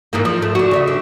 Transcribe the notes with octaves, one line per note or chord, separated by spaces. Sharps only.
G#2 E3 A#3
F3
A3
D3 F#4
C#3 C#5 E5
D3